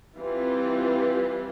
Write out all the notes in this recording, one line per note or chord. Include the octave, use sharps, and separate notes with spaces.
E3 G3 C4 F4